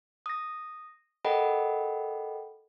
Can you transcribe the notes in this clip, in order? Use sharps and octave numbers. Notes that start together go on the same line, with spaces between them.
D#6 A#6
A4 A#4 D#5 F#5 G5 B5